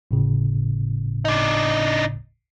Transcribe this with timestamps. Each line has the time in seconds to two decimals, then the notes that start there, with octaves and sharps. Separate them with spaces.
0.11 G1 A2 C#3
1.25 D4 D#4